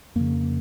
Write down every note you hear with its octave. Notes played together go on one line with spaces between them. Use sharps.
F2 C#3 A#3